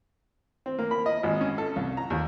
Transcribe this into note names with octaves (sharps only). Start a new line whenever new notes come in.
C4
A#3
B5
D#5
G#1
C#4
A4
C2
A#5
D#2